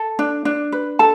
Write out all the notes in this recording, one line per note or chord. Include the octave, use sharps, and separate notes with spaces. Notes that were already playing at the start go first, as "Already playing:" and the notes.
Already playing: A4
D4
D4
B4
A4 A5